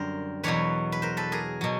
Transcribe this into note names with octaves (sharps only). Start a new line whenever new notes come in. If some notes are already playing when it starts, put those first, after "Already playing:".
Already playing: F#2 D3 G3 C4 A#4 C5
E2 B2 F#3 B4 C#5
B4
A#4 C5
A4 B4
G#4 A#4
B2 F#3